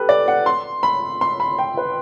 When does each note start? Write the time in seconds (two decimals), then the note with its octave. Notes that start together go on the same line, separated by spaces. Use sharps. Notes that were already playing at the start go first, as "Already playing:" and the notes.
Already playing: G4 A4 B4
0.09 D5
0.28 F#5
0.46 C6
0.83 B5
1.21 C6
1.40 B5
1.58 G5
1.77 B4